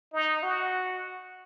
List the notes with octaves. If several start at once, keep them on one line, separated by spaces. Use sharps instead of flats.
D#4
F#4